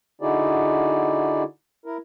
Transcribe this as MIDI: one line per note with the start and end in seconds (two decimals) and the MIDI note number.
0.21 1.43 50
0.21 1.43 63
0.21 1.43 64
0.21 1.43 66
0.21 1.43 68
0.21 1.43 74
1.86 1.97 64
1.86 1.97 70